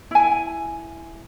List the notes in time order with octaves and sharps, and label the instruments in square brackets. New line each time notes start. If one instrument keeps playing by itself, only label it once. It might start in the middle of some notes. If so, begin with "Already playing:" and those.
[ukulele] E4 G#5